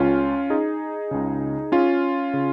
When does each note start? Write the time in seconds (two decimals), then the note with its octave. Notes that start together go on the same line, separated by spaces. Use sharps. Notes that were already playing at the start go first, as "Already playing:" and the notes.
Already playing: C#2 C#3 C#4 F4
0.50 D#4 G#4
1.11 C#2 C#3
1.72 C#4 F4
2.34 C#3